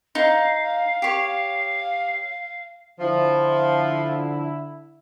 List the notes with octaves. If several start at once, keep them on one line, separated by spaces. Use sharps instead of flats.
D#4 F5
G4 C#5
D3 F3 E4